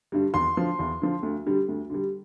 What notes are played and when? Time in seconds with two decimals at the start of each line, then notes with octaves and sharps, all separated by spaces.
0.12 G2 D3 G3
0.34 E2 C6
0.57 D3 F3
0.79 E2
1.02 D3 F3
1.23 D2
1.46 D3 G3
1.68 D2
1.90 D3 G3